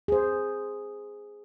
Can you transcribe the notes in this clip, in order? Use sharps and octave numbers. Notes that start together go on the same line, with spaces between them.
G#4 C5